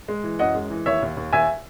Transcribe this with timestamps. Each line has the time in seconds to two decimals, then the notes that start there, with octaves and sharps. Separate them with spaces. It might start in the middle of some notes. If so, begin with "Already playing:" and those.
0.08 G#3
0.24 E3
0.39 F#2 D#5 F#5
0.55 G#3
0.70 E3
0.86 D#2 C#5 E5
1.02 D#2
1.17 D#2
1.33 D#2 E5 G#5